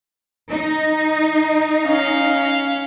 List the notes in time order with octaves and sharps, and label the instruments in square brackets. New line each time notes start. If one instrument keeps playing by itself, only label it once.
[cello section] D#4
[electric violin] C#4 F5